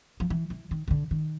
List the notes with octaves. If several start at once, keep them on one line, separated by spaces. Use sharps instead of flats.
F3
E3
E3
D#3
D#3
D3
D#3